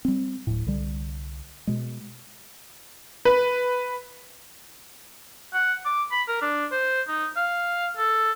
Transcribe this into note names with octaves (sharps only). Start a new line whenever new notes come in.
G3 C4
D1 A2
C2 D3 G3
B2 G#3
B4
F#5
D6
B5
A#4
D4
C5
D#4
F5
A4